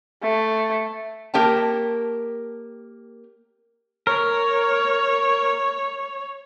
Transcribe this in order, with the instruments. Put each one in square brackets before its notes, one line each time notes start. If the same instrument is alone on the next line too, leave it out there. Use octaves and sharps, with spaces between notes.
[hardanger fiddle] A3
[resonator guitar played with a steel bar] A#3 G4 C#5 G5 A5
[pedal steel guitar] A#4 [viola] C#5